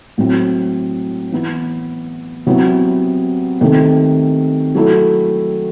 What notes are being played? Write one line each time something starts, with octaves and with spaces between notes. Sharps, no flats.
A2 F#3 C4 E4
E3 B3 E4
C3 F#3 B3 E4
C3 D#3 A3
F#3 A3 E4